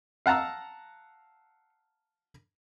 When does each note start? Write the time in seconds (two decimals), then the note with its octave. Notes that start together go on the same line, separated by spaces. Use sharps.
0.26 F5 F#5 A5 A#5 E6